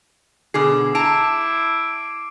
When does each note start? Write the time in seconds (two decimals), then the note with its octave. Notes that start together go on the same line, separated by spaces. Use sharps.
0.54 B2 D3 G#4 D6 C7
0.95 E4 A5 A#5 D7